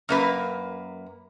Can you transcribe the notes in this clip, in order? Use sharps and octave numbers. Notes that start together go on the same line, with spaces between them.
F#2 A#3 B4